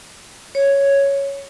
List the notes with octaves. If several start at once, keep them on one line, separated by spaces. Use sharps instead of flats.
C#5